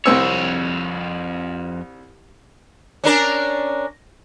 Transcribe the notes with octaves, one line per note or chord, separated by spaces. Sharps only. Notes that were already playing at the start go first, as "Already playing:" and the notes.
C2 F2 C4 C#5 E6
C#4 D4 A#4